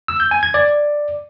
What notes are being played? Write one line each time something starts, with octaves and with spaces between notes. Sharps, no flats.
E6
G6
G#5
G#6
D5